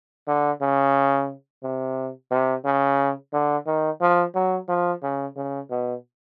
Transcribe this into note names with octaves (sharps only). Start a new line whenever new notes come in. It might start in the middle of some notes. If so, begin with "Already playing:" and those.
D3
C#3
C3
C3
C#3
D3
D#3
F3
F#3
F3
C#3
C#3
B2